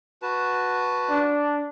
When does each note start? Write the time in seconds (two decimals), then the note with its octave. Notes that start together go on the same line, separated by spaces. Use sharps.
0.22 F#4 B4 A5
1.10 D4